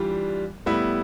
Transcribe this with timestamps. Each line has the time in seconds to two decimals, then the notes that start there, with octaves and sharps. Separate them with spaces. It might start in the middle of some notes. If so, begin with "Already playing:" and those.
Already playing: E3 G3 D4 F4
0.66 A2 G3 B3 E4